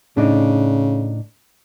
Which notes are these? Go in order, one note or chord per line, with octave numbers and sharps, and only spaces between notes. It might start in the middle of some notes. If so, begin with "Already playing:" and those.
A2 C#3 D4 D#4